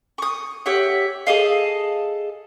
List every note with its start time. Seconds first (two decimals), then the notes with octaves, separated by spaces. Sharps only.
0.18 C#6 D#6
0.66 G4 C#5 E5 F#5
1.27 G#4 A4 D#5 F5